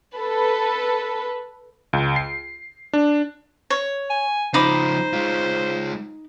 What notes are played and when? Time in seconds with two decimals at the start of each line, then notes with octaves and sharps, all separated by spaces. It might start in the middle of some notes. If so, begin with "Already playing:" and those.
0.17 A4 B4
1.93 C#2
2.16 C7
2.93 D4
3.70 C#5
4.10 G#5
4.54 C#3 F3 D#4 C5 B5 D6
5.13 G#3 F4